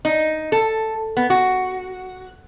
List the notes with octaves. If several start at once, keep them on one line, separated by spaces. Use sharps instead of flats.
D#4
A4
B3
F#4